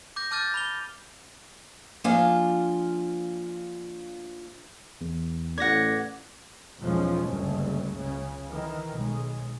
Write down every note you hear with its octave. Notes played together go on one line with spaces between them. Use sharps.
D6 G6 A#6
A5 D6 F6 G6 A6 D#7
B5 F7 G7
F3 A#3 D4 F4 F5 G#5
E2
A1 D5 F#5 G#6 A#6
B1 E2 F3 G#3 C#4
F#1 D2 G2
C#2 C#3
D#3 E3
B1 G#3